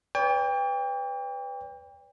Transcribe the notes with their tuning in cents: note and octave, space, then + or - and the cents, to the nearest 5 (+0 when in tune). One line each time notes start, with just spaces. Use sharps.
B4 +15 D5 -45 G5 +30